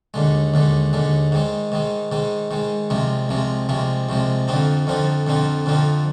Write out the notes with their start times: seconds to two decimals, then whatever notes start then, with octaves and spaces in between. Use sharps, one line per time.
0.14 D#2 D3 G#3
0.54 D#2 D3 G#3
0.93 D#2 D3 G#3
1.32 G#2 D#3 G#3
1.72 G#2 D#3 G#3
2.12 G#2 D#3 G#3
2.51 G#2 D#3 G#3
2.90 C2 C3 F3 G#3
3.29 C2 C3 F3 G#3
3.69 C2 C3 F3 G#3
4.09 C2 C3 F3 G#3
4.48 F2 D3 F3 C4 D#4
4.87 F2 D3 F3 C4 D#4
5.27 F2 D3 F3 C4 D#4
5.66 F2 D3 F3 C4 D#4